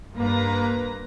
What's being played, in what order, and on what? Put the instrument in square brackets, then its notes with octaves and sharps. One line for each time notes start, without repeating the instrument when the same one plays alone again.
[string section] G2 A#3 B4 A#5